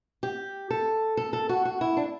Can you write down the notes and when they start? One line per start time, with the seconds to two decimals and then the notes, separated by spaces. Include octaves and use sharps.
0.23 G4
0.70 A4
1.17 A4
1.33 A4
1.49 F#4
1.65 F#4
1.81 E4
1.97 D4